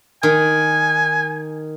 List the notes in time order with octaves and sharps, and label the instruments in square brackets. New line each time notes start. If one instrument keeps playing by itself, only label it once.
[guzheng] D#3 [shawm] G#5